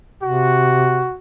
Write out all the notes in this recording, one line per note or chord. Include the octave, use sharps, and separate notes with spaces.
C3 F#4